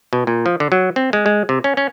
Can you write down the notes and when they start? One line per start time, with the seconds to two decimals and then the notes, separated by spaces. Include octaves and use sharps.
0.13 B2
0.27 A#2
0.46 F3
0.60 D3
0.72 F#3
0.96 C4
1.13 G#3
1.26 G#3
1.49 C3
1.64 C#4
1.77 C#4